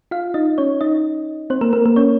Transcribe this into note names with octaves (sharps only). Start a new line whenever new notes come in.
F4 F5
D#4 D#5
C#4 C#5
D#4 D#5
C4 C5
A#3 A#4
A#3 A#4
A#3 A#4
C#4 C#5